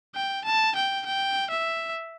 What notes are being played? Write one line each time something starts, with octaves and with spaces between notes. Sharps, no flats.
G5
A5
G5
G5
E5